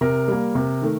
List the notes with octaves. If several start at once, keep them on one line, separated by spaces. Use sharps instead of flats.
C3 A#4
G3 A#3
C3
D#3 A3